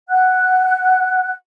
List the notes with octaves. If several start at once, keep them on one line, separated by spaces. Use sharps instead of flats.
F#5 F#6